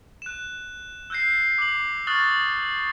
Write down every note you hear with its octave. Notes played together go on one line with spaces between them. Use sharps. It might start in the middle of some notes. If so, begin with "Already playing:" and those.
F#6 E7
E6 F#6 G6 A#6 C7
D6 F#7
C#6 D#6 F6 F#6 A6 G7